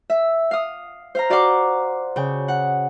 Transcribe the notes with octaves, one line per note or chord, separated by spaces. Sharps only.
E5
F5 D#6
C5 F5 A#5
F#4 D5 F5 F#5 C6 D6
C#3 G5
F#5